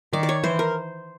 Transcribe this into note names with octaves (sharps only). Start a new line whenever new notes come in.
D#3 D5
D5
C#5
E3 C5
A#4